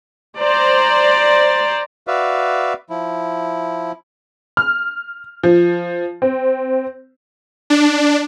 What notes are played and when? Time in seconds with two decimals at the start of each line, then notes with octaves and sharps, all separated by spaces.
0.37 C5 D5 A#5
2.07 F#4 B4 D5 E5 F5
2.90 F3 E4
4.57 F6
5.43 F3
6.22 C4
7.70 D4